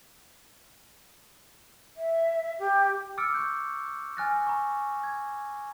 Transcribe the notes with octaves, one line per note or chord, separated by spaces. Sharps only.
E5
G4
D6 E6 F6 A6 C#7 D7
C#6 F#6 G6
G#5 F6 F#6 A6 A#6
A#5 C#6
G#6